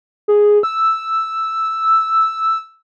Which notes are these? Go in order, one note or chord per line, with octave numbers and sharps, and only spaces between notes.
G#4
E6